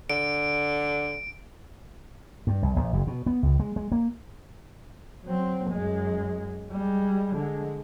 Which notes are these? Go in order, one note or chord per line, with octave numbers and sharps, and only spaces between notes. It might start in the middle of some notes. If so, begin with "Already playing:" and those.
D3 D7
G2
C2
A#1
F#1
B2
B3
C#2
G#3
G#3
A#3
F#3 C4
F#2 G#3
G3 G#3
D3 G#3